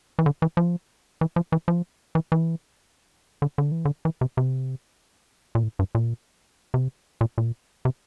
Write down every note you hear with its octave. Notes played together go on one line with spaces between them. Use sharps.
E3
D3
E3
F3
E3
F3
E3
F3
E3
E3
D3
D3
E3
D3
E3
C3
C3
A#2
A2
G2
A#2
C3
A#2
A#2
C3